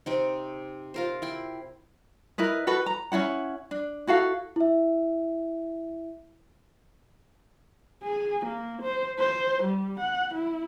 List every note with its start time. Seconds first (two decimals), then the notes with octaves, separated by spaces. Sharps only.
0.06 C3 C4 D#4
0.94 F4 A#4 C5
1.22 E4 G5 C6
2.38 E4 A#4 B4 D#5
2.67 F#4 A4 B4
2.86 A#5
3.12 C#4 D4 E4 F#5
3.71 D4
4.07 E4 F#4 A4 F5
4.56 E4 E5
8.03 G#4
8.46 A#3
8.82 C5
9.19 C5
9.63 G3
10.00 F#5
10.34 E4